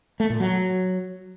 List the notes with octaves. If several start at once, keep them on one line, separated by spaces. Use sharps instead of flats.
A3
A#2
F#3